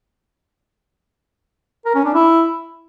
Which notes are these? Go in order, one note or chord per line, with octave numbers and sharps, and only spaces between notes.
A#4
C#4
D4
E4